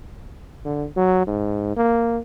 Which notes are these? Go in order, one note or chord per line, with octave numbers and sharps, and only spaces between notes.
D3
F#3
G#2
A#3